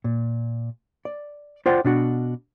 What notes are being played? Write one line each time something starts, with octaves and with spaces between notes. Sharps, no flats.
A#2
D5
F4 C5 D5 F#5 G5
B2 D4 F#4